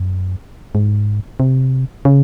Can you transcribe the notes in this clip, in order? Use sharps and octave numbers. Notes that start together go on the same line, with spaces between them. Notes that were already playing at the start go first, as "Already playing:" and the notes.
Already playing: F#2
G#2
C3
C#3